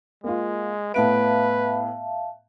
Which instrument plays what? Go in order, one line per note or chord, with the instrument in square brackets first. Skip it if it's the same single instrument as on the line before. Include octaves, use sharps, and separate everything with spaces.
[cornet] G#3 [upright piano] A#3 F4
[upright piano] A2 B3 D7 [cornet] B4 [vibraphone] E5 F5 A5